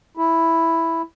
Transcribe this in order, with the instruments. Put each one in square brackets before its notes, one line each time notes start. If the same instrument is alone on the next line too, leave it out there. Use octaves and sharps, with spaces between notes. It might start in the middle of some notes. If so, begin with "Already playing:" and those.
[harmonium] E4